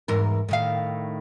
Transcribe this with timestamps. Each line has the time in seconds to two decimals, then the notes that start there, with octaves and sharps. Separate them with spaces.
0.08 E2 G#2 A#4
0.49 A2 D#3 F5